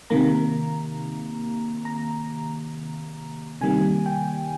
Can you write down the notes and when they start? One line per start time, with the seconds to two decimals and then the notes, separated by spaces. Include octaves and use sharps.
0.10 C3 D#3 A#3 A#5
1.85 A#5
3.61 C3 D#3 G3 A#3 G#5
4.06 G5